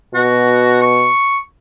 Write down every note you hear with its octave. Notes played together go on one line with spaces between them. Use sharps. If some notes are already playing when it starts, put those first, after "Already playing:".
B2 F#4
C#6